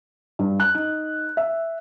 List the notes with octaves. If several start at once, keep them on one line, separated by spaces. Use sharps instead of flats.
G2
F#6
D#4
E5